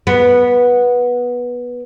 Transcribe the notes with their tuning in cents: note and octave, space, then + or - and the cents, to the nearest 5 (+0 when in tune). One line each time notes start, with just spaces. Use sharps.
B3 -15